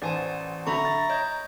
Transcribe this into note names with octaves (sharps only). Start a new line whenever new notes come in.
A1 C5 D5 G#5 A5
D3 F#3 A3 E5 A#5 B5 C#6
A6
C#5 D#5 G6